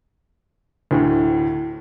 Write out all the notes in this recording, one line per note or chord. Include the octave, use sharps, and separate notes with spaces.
D2 A2